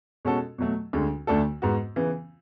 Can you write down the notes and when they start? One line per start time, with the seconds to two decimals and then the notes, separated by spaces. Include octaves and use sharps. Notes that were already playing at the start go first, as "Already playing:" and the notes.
0.25 B2 G#3 C#4 F#4 A4
0.58 B2 F#3 A3
0.93 D2 D3 G#3
1.27 D2 D3 A3 D4 A4
1.62 G#2 G#3 B3 F#4
1.96 C#3 E3 B3